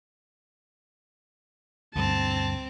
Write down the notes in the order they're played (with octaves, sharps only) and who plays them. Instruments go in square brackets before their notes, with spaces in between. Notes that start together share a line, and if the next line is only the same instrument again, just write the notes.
[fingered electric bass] D2 G2 [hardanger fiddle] C4 [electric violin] A5